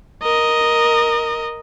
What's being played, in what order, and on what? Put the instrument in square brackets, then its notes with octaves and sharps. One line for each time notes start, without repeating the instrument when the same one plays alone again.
[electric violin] A#4 D#5